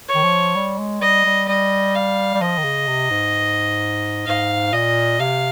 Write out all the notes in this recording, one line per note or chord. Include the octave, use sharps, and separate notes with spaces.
C#5
D#3
F3
G3
G#3
G3 D#5
G3
G3 D#5
F5
G3
F3 D#5
D#3
C#3
C3
G#2
G#2 F5
A#2 D#5
C3 F5